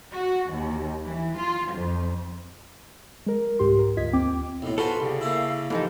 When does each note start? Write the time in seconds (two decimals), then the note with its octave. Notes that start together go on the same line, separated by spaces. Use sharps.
0.14 F#4
0.51 D#2
1.06 E3
1.38 F4
1.74 F2
3.26 G#3 A#4
3.59 C2 G#2 G4 C6
3.79 A#4
3.97 D2 F4 D#5 G#6 B6
4.13 D#2 C4 G5 D6
4.62 B1 A2
4.78 F4 F#4 A4 B4 C5 G#5 D#6
5.00 C2 C#3 G4 D5
5.21 A#3 E4 F5 E6
5.70 G#2 E3 F3 D#4 G4 A4 D#5